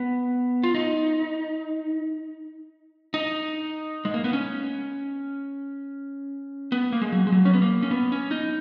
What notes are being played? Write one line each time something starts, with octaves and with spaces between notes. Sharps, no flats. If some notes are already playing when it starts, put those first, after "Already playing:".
Already playing: B3
F4
D#4
D#4
G#3
A#3
B3
C#4
B3
A#3
G#3
F#3
G#3
F#3
C#4
B3
A#3
C#4
B3
C#4
D#4